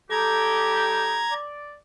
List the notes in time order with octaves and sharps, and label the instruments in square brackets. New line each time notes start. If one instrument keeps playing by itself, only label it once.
[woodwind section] G3 D#4 G4 [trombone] A4 [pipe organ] A#5 G#6
[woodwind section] D5